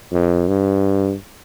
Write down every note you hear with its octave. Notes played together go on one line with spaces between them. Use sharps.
F2
G2